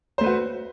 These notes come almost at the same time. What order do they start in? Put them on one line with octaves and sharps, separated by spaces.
C5 A3 B4 F#4